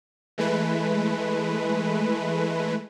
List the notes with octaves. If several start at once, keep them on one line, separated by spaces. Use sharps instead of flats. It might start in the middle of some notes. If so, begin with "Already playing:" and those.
E3 G#3 A3 B4